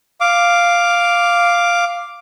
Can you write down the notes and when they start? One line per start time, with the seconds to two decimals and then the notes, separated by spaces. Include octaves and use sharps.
0.21 F5 D6